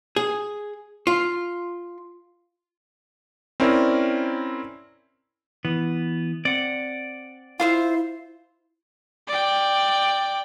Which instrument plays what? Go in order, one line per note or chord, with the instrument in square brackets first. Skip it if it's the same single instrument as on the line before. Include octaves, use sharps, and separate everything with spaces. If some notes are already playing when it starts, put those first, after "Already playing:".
[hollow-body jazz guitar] G#4
F4
[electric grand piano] C4 C#4 E4 A#4 D5
[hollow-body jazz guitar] E3 [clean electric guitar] B3
[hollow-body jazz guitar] C4 [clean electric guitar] D5 F#5
[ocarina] E4 [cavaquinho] F4 C5 E5
[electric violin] D5 G5